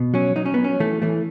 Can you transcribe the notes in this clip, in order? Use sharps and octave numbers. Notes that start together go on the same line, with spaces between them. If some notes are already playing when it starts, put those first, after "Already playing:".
Already playing: B2
F#3 C#4
F#3 D#4
C#4
B3
F#3
C#4
E3 A3
E3 A3